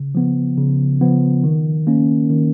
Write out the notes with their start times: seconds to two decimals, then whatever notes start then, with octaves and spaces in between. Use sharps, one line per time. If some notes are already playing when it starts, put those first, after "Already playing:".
Already playing: C#3
0.15 F3 B3
0.58 C#3
1.01 F3 B3
1.44 D#3
1.87 A#3 C#4
2.30 D#3